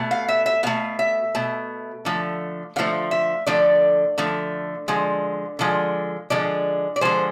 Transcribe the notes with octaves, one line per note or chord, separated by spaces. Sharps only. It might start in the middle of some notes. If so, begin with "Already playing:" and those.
Already playing: B2 A3
F5
E5
E5
B2 A3 F5
E5
B2 A3
D3 F3 A3
D3 F3 A3 F5
E5
D3 F3 A3 D5
D3 F3 A3
D3 F3 G#3
D3 F3 G#3
D3 F3 G#3 D5
D5
D3 F3 G#3 C5